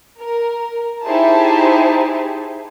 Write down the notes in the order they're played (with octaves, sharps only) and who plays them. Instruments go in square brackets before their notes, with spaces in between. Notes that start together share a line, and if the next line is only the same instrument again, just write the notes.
[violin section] A#4
D#4 E4 G4 G#4 C5 A5